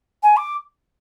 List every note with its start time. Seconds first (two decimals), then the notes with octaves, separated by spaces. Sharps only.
0.23 G#5
0.37 D6